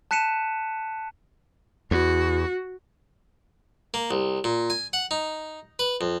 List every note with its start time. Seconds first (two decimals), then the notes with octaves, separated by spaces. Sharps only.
0.11 A5 F#6 B6 C#7 D#7 E7
1.91 E2 F#4
3.94 A#3
4.11 C2
4.44 A#2
4.70 G#5
4.93 F#5
5.11 D#4
5.79 B4
6.01 F2